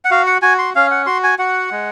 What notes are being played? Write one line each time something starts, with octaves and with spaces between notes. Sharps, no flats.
F#5
F#4 F5
F#5
F#4 G#5
C6
C#4 F5
F#5
F#4 C6
G#5
F#4 F#5
G#3